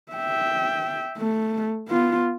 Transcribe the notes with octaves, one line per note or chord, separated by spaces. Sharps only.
E5 G5
A3
B3 F4